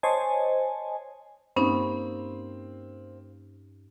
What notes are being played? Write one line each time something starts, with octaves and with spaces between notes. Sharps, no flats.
C5 C#5 D#5 G#5 A5
G2 A#3 C4 C#4 D#4